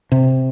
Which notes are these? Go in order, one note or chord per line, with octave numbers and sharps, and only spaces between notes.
C3